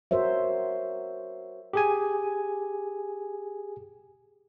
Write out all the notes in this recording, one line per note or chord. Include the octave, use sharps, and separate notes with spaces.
F#4 A#4 C5 C#5 E5
G4 G#4 G#5